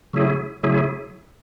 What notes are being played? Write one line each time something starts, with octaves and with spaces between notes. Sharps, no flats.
C#3 F#3 A3 E4 G#4
C#3 F#3 A3 E4 G#4